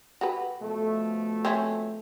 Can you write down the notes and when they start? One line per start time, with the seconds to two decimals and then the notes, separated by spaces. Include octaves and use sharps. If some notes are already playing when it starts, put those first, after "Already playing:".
0.21 F#4 G4 B4
0.61 B2 F3 A3
1.45 C4 C#4 E5